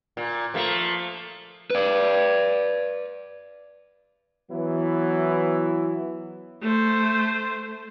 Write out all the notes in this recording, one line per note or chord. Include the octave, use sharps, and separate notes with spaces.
A#2
F3 A3 A#3
B4 D5
E3 F#3 B3 E4
A3 C5